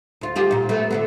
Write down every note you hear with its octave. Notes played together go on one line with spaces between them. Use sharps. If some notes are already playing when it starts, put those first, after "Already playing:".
D2 F4
F4 G4 G#4
A#2 D#4
A3 B3
D3 A3 B3